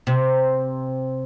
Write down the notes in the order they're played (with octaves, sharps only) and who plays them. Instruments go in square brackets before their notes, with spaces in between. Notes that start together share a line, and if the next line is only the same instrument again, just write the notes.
[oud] C3